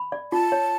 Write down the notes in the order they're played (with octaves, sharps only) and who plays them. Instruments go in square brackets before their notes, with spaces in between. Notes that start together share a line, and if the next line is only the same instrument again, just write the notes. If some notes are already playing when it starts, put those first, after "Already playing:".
Already playing: [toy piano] B5
D5
[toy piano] F4 [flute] A5
[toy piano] C#5